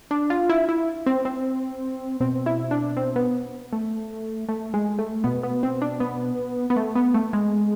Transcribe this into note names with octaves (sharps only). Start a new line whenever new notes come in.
D4
F4
E4
E4
C4
C4
B2 C4
E4
D4
C4
B3
A3
A3
G#3
A3
B2 B3
B3
C4
D4
B3
B3
A3
B3
A3
G#3